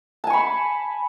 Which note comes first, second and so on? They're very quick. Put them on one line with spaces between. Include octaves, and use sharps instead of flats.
A5 G#5 C#6 B5